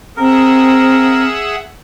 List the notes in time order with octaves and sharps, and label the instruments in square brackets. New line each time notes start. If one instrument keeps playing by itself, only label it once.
[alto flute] C4 [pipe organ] G#4 E5 F#5 [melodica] A#4